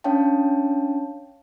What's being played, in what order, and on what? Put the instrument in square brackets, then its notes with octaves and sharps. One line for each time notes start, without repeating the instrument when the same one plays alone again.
[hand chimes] C#4 D4 C#5 F5 G5 A5